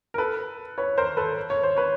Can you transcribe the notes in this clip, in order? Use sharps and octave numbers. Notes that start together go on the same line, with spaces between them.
A#4
A4 B4
B4 C#5
A#4 C5
A4 B4
C#5
C5
B4 C#5